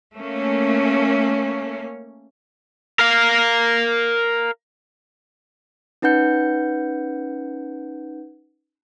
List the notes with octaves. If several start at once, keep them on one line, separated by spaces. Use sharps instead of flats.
A3 A#3 C#4
A#4 F5
C#4 D#4 B4 F#5 G6 C#7